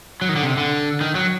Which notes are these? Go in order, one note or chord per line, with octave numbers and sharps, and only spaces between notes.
F#3
D#3
D3
C3
D3
D#3
F#3